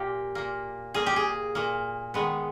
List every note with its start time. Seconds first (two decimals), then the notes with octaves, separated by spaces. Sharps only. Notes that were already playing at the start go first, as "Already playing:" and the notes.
Already playing: A#2 A#3 G4
0.35 A#2 A#3
0.94 A#2 A#3 G#4
1.06 G4
1.16 G#4
1.55 A#2 A#3
2.14 D#3 G#3 B3